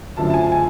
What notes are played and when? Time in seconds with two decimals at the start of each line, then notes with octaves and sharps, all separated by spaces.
0.17 F#2 D3 F3 A3 A5
0.30 A5
0.34 G#5
0.52 G#5